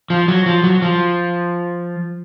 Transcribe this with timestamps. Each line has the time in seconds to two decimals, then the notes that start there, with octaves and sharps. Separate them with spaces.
0.10 F3
0.28 F#3
0.46 F3
0.64 F#3
0.82 F3